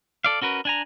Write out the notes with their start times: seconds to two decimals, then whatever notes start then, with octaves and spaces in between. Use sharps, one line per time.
0.24 A4 D5 F5
0.42 C#4 F#4 A#4 B4
0.65 D4 G#5 A#5